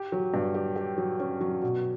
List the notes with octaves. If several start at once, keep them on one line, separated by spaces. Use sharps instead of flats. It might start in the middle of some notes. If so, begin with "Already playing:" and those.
Already playing: G4
F#3
G2
G4
G4
F#3
C#4
F#3
B2